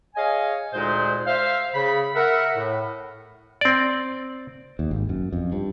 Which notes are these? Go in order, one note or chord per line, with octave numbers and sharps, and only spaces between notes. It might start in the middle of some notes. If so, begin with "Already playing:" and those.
G#4 C#5 D#5 F5 G#5
D2 A#2 G#3 D#4 G#4 C5
C5 E5 F5
C#3 B5
A#4 E5 F#5
A2
C4 D5
D#2
G#1
F#2
F2
G2